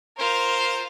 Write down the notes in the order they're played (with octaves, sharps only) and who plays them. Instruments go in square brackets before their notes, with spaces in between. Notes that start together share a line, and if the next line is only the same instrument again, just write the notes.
[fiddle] F4 [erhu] A#4 [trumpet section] C5